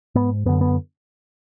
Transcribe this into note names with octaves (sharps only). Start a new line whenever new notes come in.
G#2 B3
F#2 D3 B3
B3